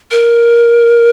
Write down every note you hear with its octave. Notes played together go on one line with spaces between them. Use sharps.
A#4